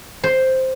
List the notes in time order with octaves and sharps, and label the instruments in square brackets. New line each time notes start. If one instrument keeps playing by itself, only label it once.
[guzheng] C5